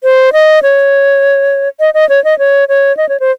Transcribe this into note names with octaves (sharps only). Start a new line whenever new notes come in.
C5
D#5
C#5
D#5
D#5
C#5
D#5
C#5
C#5
D#5
C#5
C5